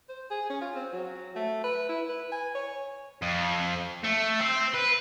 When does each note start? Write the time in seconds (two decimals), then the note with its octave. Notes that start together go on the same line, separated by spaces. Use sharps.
0.09 C5
0.30 G#4
0.50 C#4
0.61 F4
0.75 C4
0.93 F#3
1.36 A3
1.64 B4
1.89 E4
2.09 B4
2.32 G#5
2.55 C#5
3.22 F2
4.04 A3
4.40 C4
4.74 B4